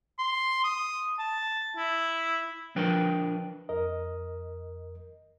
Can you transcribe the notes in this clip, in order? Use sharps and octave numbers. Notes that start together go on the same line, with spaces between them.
C6
D#6
A5
E4
F3 D4 A#4 B4 G5
F2 A#4 D#5